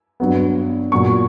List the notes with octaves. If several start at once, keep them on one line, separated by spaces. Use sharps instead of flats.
G2 F#3 B3
A#2 F#3 B3 C#6